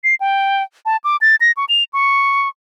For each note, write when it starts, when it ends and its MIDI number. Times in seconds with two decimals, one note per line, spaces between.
0.04 0.15 96
0.20 0.63 79
0.86 0.97 81
1.04 1.17 86
1.21 1.36 93
1.41 1.52 94
1.57 1.65 85
1.69 1.84 101
1.93 2.49 85